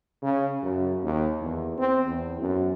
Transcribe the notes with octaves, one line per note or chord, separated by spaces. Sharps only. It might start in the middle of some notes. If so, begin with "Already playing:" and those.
C#3
F#2
D#2
E2
C4
E2
F#2